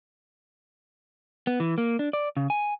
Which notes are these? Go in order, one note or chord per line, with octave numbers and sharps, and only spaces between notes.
B3
E3
A#3
D4
D5
C#3
G#5